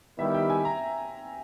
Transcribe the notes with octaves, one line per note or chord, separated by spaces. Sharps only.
D#3 G3 B3 E4 G4 E5
G5
G#5
A#5